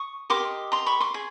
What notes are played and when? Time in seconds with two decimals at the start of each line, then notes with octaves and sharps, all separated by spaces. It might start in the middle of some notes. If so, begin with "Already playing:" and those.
Already playing: C#6 D#6
0.30 G4 A#4 D#5 C6 D6
0.72 A#5 C6
0.86 B5 C#6
1.00 C6 D6
1.14 G#4